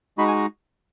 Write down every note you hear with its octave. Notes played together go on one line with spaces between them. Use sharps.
G#3 D#4 F#4 B5
G#5